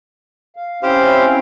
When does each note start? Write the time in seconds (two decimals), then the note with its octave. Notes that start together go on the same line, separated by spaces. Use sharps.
0.56 F5
0.83 C4 C#4 E4 G4 C5 F5